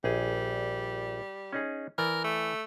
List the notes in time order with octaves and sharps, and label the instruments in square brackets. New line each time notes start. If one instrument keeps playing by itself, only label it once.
[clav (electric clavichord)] A#1 G#4 [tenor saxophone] G3
[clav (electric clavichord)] C#4 D#4 G#4
[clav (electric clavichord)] E3 D5 [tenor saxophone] A#4
[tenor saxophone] A3